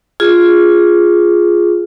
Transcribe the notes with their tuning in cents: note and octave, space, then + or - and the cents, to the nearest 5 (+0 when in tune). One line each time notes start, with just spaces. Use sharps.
F4 +0 G#4 +0